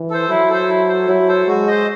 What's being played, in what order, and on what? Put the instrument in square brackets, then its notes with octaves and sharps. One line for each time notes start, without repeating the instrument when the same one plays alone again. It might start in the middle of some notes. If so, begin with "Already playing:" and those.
Already playing: [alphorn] E3
[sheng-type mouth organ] A4 C5
[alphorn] F#3 [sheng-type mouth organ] E4
[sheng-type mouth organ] A4 C5
E4
A4 C5
[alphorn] F#3 [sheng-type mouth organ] E4
[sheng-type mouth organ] A4 C5
[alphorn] G#3 [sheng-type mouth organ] F#4
[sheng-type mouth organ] C5 D#5